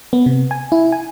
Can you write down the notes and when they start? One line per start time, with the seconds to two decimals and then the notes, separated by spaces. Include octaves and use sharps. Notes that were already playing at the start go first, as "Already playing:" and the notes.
0.13 B3
0.26 C3
0.51 G#5
0.72 E4
0.92 G#5